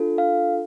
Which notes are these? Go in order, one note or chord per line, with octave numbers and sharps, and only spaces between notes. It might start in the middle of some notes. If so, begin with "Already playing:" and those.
Already playing: D4 F4 A4
F5